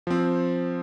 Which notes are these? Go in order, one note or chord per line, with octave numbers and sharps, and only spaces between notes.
F3 C4